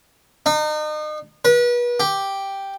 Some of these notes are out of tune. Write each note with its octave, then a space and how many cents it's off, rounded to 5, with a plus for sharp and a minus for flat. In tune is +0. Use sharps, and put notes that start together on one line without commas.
D#4 -35
B4 -35
G4 +0